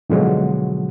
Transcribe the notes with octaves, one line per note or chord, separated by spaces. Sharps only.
G#2 B2 D3 F3 F#3 G#3